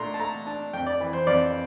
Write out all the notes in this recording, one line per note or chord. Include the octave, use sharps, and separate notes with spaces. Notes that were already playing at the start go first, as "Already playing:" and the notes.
Already playing: A#2 A3 D4 A#5 C6
A5
A3 A#5
D4 A5
F2 G5
D5
E3
C5
F2 D5